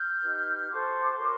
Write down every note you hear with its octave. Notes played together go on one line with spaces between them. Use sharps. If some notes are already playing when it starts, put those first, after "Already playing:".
Already playing: F6 G6
D#4 G4 B4
F#4 A4 C5 C6 D6
F#4 A#4 C#5